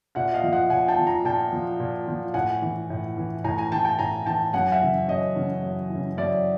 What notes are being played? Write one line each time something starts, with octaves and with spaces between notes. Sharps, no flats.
A#2 E5 F#5
D#5 F5
F3
E5 F#5
A#2 F#5 G#5
G5 A5
F3
G#5 A#5
A#2 G5 A5
F3
A#2
F3
A2 F#5 G#5
E3
A2
E3
A2 G#5 A#5
G#5 A#5
E3 G5 A5
G5 A5
A2 G#5 A#5
E3 G5 A5
F#2 F#5 G#5
E5 F#5
C#3 E3
F#2 C#5 D#5
C#3 E3
F#2
E3
C#3
F#2 D5 E5